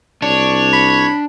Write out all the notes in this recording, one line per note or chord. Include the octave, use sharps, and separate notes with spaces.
C2 D4 C#5
B5